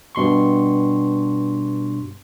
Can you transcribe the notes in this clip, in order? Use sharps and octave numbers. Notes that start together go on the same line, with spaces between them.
G2 B2 C6 C#6